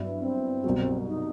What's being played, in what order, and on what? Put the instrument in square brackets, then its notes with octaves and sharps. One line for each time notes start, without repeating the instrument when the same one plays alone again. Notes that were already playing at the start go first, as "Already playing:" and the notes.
Already playing: [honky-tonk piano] G2 F#3 B3 E4
[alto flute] C4
[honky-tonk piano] C2 B2 F#3
[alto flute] D#4